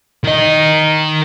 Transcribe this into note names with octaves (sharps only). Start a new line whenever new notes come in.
D#3 D#5